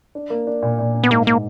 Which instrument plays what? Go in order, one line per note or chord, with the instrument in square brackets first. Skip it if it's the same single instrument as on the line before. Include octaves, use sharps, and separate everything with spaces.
[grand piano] D4
A#3
D4
A#2
A#2
D4
[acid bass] B3
[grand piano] G#2 [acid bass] A#3
[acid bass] A#3